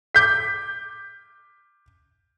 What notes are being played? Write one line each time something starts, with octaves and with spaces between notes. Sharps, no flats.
D6 G6 B6